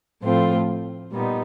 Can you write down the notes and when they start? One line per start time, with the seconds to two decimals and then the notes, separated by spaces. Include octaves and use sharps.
0.22 A2 F3 A3 C4 F4
1.13 A#2 G3 B3 D#4